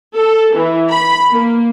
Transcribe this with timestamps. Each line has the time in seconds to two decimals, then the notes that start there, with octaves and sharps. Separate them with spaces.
0.16 A4
0.55 E3
0.90 B5
1.31 A#3